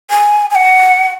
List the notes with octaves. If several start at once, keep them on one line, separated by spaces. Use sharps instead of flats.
G#5
G#5
F#5